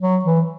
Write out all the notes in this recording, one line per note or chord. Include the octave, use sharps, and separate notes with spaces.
F#3
E3